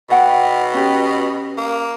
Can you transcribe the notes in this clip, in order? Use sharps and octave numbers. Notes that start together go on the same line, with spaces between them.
B2 E5 F#5 G5
C#4 G4
A#3